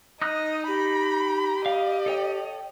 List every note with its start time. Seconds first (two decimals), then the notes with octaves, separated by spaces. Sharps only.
0.22 D#4 D#5 D#6 F#6
0.68 G4 B5
1.66 D#5 F5
2.06 A4 C#5 G5